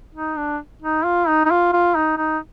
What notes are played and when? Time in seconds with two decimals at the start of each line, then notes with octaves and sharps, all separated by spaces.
0.15 D#4
0.37 D4
0.82 D#4
1.05 F4
1.28 D#4
1.45 D#4
1.51 F4
1.73 F4
1.95 D#4
2.18 D#4